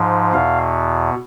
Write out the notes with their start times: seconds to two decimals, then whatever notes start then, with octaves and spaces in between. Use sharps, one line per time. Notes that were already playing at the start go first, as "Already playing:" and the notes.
Already playing: G#2 F3
0.33 E2 B2 F5